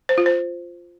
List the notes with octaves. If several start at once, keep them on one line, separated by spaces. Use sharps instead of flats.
C5
F4
C5